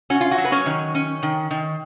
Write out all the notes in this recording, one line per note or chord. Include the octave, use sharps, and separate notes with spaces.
C#4 F#4
F4
F#4
F#3
B4
C#4 C#5
D#3
C#4
D#3
D#3